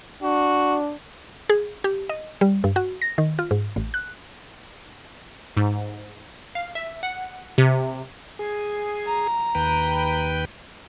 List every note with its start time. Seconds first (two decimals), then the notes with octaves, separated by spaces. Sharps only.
0.23 D4 F#4
1.49 G#4
1.84 G4
2.09 D#5
2.41 G3
2.64 G2
2.76 F#4
3.02 A#6
3.18 D#3
3.39 F4
3.51 G#2
3.76 A1
3.94 F#6
5.57 G#2
6.55 F5
6.75 E5
7.03 F#5
7.58 C3
8.39 G#4
9.05 A#5
9.55 D#2 B4 G5